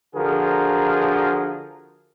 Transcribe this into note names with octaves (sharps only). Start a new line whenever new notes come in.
D3 F3 F#4 G#4 A#4